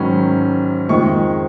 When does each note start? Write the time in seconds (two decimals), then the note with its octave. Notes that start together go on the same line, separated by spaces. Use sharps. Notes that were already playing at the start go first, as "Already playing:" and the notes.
Already playing: G#2 D#3 F#3 C#4 B5
0.89 F2 D#3 G#3 C#6